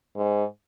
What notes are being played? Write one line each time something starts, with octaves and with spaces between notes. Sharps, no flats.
G#2